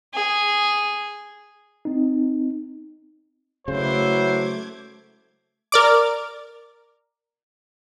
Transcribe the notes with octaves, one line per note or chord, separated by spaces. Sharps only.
G#4
C4 D#4
C#3 F#3 A3 E4 B4 C5 D6 G#6
A#4 D5 D6